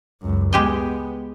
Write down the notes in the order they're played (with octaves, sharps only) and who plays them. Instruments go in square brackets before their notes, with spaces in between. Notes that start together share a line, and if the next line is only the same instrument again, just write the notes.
[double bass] C#2 F#2
[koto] G#3 G4 D#5 [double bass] B3